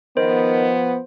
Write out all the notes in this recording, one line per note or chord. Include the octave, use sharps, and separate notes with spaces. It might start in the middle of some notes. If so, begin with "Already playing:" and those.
D#3 F3 B3 C5